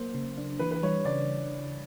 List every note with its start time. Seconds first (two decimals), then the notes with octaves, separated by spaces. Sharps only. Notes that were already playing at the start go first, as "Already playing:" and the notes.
Already playing: F#3 A#3 C5
0.14 C#3
0.38 D4
0.59 E3 B4
0.71 B4
0.82 G3 C#5
1.05 C#3 D5